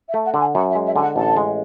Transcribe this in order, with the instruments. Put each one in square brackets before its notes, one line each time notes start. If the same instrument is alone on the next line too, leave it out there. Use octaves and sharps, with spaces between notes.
[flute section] E5
[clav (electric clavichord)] A3
[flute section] F#5
[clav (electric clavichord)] D3
[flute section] G#5
[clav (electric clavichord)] F#2 [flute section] F#5
[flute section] E5
[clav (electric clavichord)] G#3
[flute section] E5
[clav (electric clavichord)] D3 [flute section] G#5
[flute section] F#5
[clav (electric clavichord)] A1 [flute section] A5
[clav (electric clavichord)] G#3